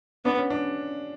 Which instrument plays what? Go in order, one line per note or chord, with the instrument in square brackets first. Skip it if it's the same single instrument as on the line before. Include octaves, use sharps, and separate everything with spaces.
[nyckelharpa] B3 [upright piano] D4
[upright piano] C#4
D4